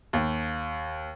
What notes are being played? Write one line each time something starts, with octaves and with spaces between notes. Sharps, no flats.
D#2